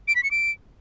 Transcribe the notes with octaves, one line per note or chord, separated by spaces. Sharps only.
D7
B6
C#7
D7